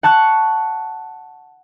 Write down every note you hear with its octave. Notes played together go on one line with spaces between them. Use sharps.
F#5 A5 C#6 F#6